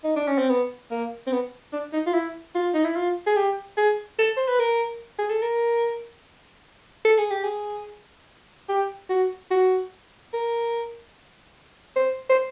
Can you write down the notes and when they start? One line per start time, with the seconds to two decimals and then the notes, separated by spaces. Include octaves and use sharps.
0.04 D#4
0.16 D4
0.27 C#4
0.38 C4
0.50 B3
0.91 A#3
1.27 C4
1.33 B3
1.73 D4
1.93 D#4
2.06 F4
2.14 E4
2.55 F4
2.74 D#4
2.84 E4
2.96 F4
3.27 G#4
3.37 G4
3.77 G#4
4.19 A4
4.37 C5
4.48 B4
4.59 A#4
5.19 G#4
5.30 A4
5.42 A#4
7.05 A4
7.18 G#4
7.31 G4
7.44 G#4
8.69 G4
9.09 F#4
9.51 F#4
10.33 A#4
11.96 C5
12.29 C5